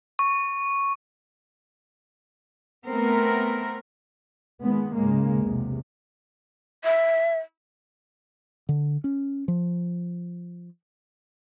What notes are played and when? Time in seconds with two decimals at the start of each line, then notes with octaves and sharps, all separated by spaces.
0.19 C#6
2.88 A3 B3 C4 A#4
4.61 D#3 G#3 B3
4.95 C#2 G#2 C#3 G#3 A#3
5.39 B1 E2 C3
6.84 E5
8.69 D3
9.04 C#4
9.48 F3